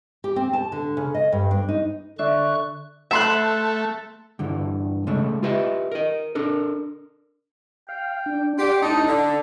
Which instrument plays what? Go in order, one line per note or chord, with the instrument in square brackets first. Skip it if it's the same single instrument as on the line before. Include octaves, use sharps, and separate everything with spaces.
[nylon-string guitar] G4
C4
A5
D3
C#3
D#5
G2
D4
D#4
[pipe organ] D3 C#6 F#6 [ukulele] D4 E5
[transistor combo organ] A3 [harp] E5 C6 F#6
[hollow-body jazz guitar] G2 D3 E3
C#3 G#3 A3
F4 G4 B4 D#5 E5
A#4 D#5
D4 A4 A#4
[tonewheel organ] F5 [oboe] G5
[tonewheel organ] D4
[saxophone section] G4 [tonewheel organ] D5 F#5 D6 [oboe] C6
[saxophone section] A2 D#4 [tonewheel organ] D4 [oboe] A5
[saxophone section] D3